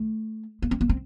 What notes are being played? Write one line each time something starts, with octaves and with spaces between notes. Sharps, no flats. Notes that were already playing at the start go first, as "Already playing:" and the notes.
Already playing: A3
B3
C4
B3
C4